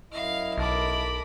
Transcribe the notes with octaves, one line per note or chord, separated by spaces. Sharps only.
F#2 E4 D#5 F5 F6
B1 A#4 A5 B5 D6